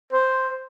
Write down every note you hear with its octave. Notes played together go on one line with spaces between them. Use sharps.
C5